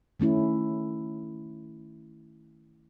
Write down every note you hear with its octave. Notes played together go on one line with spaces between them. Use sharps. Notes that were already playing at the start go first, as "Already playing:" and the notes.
D#3 A3 C#4 E4